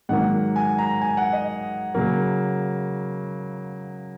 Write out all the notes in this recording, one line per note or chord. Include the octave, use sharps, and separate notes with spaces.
G#2 D#3 F#3 A#3 F#5
G#5
A#5
G#5
F#5
D#5
C#3 F#3 A#3